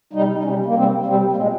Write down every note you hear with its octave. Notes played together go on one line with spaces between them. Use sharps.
C3 G3 D#4
D#4
C3 G3 C#4
A#3
C3 G3 C4
C3 G3 C4
A#3
A#2 G#3 C4